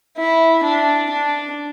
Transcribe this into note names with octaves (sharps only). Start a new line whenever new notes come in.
E4
D4
D4